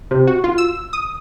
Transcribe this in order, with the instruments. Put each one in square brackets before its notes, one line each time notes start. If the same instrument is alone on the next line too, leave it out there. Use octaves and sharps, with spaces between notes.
[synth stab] C3
F#4
F4
E6
D#6